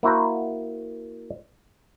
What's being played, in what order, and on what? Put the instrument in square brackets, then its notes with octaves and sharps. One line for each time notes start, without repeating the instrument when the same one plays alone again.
[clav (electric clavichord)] A#3 E4 F#4 C5 A#5